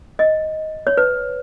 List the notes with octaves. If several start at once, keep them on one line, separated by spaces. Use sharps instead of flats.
D#5
C#5
B4